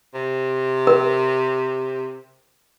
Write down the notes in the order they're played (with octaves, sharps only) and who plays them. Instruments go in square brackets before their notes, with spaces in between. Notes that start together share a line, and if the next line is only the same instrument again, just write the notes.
[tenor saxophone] C3
[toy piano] A#4